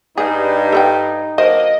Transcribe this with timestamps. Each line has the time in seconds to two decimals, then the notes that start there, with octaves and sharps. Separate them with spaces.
0.18 G2 D#4 G#4
0.72 A4 B4 G5
1.38 D3 F#3 A#3 C5 D#5